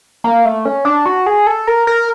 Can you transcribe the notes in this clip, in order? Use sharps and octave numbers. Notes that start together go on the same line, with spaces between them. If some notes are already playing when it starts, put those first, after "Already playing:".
A#3
A3
C#4
D4
F#4
G#4
A4
A#4
A#4